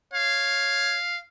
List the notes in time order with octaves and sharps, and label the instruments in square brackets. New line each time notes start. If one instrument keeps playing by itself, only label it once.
[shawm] C#5 [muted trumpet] F5